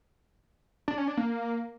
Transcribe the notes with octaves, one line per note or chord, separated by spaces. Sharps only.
D4
C#4
D4
A#3